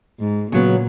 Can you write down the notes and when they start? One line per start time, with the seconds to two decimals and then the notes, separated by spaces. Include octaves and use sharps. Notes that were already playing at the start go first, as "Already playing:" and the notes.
0.20 G#2
0.52 A#2 C#3 F#3 B3